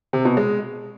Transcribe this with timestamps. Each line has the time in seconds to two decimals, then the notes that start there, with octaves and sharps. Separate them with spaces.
0.13 C3
0.25 B2
0.37 G#3